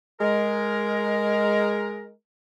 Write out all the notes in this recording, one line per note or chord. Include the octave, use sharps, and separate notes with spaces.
G#3 A#4